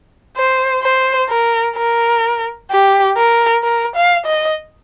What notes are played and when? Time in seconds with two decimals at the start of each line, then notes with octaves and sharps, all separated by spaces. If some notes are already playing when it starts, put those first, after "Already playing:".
0.37 C5
0.83 C5
1.29 A#4
1.76 A#4
2.71 G4
3.17 A#4
3.63 A#4
3.95 F5
4.26 D#5